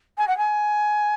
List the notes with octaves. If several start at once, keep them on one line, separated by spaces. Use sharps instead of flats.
G#5
F#5
G#5